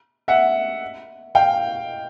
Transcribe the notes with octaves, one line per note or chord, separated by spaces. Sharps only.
E5 F#5
F5 G5